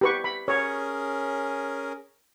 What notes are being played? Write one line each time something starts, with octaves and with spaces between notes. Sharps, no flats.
G4 B4 C#6
B5
C#4 G#4 A#4 C#5